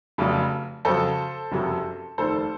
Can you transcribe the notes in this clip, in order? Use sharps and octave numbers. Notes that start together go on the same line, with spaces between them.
F1 F2 C#3 F#3
F2 C#3 F#3 A4 C5
F#1 F2 C3 F#3
F1 D#2 D#3 A4 C5